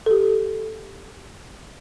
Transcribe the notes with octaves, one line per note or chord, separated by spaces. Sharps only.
G4 A4